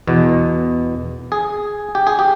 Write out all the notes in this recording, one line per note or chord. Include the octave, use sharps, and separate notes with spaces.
E2 B2
G#4
G4
G#4
G4